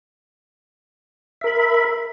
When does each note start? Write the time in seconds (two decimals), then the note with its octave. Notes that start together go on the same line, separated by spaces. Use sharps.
1.41 E5
1.44 A#4
1.47 B5